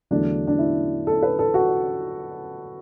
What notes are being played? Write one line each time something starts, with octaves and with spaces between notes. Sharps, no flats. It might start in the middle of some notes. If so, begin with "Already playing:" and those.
E2 D3 F#3 A3 D4
D4
E4
A4
B4
A4
F#4